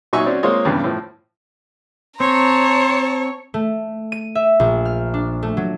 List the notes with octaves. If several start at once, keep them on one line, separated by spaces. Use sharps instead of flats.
A#2 F#3 D#4 E5 G#5 C#6
F#3 C4 C#4 C#5 D5
G#3 A#3 C4 F4 C#5 D#5
E2 G2 C#3
A2 F3
C4 C#5 A5 A#5 C6
A3
D#7
E5
A#1
F6
D4
A3
F#3